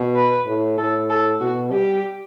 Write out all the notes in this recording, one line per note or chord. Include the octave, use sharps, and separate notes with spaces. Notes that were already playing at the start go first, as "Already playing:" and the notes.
Already playing: B2
B4
A2
A2 A4
A4
B2 F#4
G3 G4